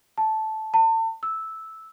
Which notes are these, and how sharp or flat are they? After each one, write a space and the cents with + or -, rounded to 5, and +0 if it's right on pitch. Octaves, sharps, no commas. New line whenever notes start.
A5 -10
A5 +35
E6 -10